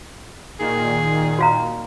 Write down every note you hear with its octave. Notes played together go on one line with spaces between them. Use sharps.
A#2 D#3 G#4
F#4 F5 A#5